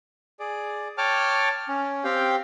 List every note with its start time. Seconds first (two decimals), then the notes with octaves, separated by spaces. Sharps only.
0.39 G#4 D5
0.98 C#5 G5 A5 D6 F6
1.69 C#4
2.04 C4 G4 F5 G5